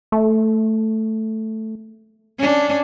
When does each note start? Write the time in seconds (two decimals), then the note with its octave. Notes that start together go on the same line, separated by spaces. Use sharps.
0.12 A3
2.38 C#4 D4